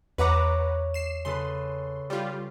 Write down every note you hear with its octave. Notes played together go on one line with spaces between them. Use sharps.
E2 B4 C#5 E5 F#5 A#5 D6
C7 E7
C#3 A4 B4 C6
G3 F4